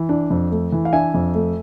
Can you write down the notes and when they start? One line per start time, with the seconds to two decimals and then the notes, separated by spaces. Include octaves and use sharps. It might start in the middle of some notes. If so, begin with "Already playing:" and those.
Already playing: E3
0.09 D4
0.30 F2
0.51 A3
0.72 E3
0.85 F5
0.93 D4 E5 G#5
1.14 F2
1.35 A3